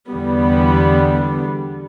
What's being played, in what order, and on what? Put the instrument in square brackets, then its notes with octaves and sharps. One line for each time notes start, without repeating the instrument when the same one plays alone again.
[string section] E2 D3 G3 B3